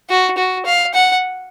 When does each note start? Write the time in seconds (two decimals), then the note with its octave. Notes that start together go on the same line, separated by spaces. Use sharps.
0.10 F#4
0.38 F#4
0.66 F5
0.94 F#5